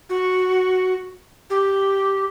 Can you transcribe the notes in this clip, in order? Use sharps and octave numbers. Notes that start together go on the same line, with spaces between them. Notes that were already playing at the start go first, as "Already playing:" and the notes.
F#4
G4